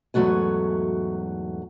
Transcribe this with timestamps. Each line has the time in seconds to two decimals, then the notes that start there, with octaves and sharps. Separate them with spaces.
0.14 E2 G#2 F#3 A3 F#4 G#5